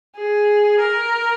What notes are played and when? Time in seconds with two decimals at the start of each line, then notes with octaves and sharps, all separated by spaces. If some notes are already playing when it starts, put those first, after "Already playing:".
0.16 G#4
0.80 A#4